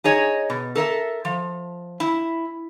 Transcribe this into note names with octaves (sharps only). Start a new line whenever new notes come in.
D#4 G#4 C#5 D#5
B2
A4 A#4 D#5 E5
F3
E4